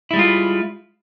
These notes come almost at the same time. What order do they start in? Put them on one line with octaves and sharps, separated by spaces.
E4 G3 G#3 F4